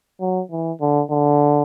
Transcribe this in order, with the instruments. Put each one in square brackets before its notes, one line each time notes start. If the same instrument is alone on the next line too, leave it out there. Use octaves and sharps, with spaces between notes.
[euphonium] F#3
E3
D3
D3